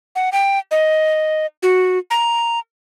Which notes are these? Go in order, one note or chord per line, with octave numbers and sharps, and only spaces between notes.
F#5
G5
D#5
F#4
A#5